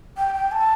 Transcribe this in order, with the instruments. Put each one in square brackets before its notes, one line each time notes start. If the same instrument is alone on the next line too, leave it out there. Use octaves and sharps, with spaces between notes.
[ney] G5
G5
A5